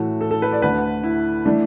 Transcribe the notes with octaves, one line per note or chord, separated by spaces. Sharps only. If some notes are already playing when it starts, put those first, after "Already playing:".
Already playing: A2 E3 A3 F#4
A4
A4
B4
D5
D2 D3 A3 B4
E4
E3 A3 D4